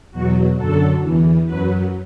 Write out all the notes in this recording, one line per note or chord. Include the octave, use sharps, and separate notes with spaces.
E2 B2 F#3 F#4
F#2 D3 F#3 A4
E2 E3
F#2 F#3 B4